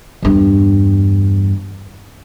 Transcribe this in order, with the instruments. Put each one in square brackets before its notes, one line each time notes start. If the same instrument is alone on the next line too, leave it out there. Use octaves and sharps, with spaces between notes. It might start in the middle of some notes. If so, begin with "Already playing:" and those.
[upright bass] E2 G2